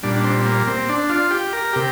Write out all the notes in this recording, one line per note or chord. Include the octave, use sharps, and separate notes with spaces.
A#2 G3 D4
D4
C4
C4
A#3
C4
D4
F4
G4
A#4
C3 G4